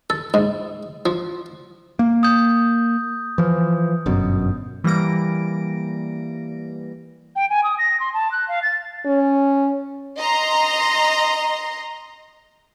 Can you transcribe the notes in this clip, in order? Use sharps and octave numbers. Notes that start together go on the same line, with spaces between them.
A4
G#2
F3
A#3
D#6 G6
E3 F3
G1 F#2 B2
E3 G3 A#3 A#6 D7
G5
G#5
D#6
A#6
C6
A5
F#6
F5
A6
C#4
D#5 A#5 C6